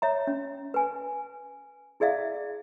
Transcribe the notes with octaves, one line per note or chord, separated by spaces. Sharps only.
C#5 E5 A#5
C#4
B4 G#5
E4 G#4 D5 E5 F5